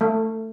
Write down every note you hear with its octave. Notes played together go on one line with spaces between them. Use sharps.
A3